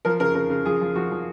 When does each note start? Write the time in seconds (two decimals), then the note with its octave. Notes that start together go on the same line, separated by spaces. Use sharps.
0.05 F3 A#4
0.20 C#3 A#4
0.35 C#3 A#4
0.50 C#3
0.65 F3 G#4
0.81 F3
0.95 F3 F#4
1.11 F3